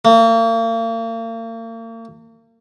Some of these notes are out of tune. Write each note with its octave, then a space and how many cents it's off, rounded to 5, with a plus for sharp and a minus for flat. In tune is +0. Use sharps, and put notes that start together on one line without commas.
A#3 -40